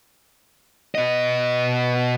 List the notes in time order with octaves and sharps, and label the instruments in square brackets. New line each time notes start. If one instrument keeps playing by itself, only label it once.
[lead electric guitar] B2 D#5